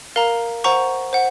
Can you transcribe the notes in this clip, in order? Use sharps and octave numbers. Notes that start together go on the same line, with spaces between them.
A#4 F5 A#5
C5 F#5 A#5 C#6
C5 F#5